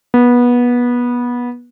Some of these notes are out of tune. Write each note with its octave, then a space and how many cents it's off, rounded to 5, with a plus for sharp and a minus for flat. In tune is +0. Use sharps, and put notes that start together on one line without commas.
B3 -20